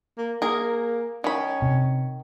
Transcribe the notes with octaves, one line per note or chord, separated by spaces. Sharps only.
A#3
A#3 G#4 A#4
D#3 C#4 B5
C3